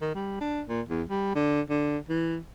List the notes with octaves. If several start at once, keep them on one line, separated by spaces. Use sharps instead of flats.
D#3
G3
D4
A#2
E2
G3
D3
D3
E3